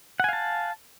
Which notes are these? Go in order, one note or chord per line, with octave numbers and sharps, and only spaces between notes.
F5 F#5 G#5 A5